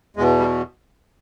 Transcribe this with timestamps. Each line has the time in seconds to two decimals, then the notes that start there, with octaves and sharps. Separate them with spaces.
0.16 E2 G#3
0.19 B2
0.39 G3